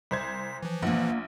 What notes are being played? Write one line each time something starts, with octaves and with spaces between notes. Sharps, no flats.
C2 C5 G#6 B6
E3 F3
A#1 A#3 F#5